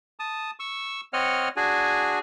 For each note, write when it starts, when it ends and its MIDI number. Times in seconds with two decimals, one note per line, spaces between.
0.19 0.51 81
0.19 0.51 87
0.60 1.01 85
0.60 1.01 88
1.13 1.49 60
1.13 1.49 73
1.13 1.49 75
1.13 1.49 78
1.13 1.49 89
1.56 2.19 62
1.56 2.19 66
1.56 2.19 68
1.56 2.19 80